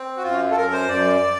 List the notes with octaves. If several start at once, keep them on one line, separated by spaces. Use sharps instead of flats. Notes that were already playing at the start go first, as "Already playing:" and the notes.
Already playing: C4
F#4
F#2 F4
A4
F#2 A#4
C5
F#2 D5